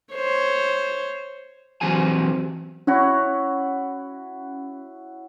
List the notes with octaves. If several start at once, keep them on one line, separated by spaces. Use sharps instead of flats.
C5 C#5
E3 F#3 C4 G4 G#4 G#5
C#4 E4 F#4 C#5